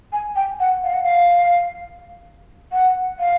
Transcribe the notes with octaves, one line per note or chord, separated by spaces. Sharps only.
G#5
G5
F#5
F5
F#5
F5
F#5
F5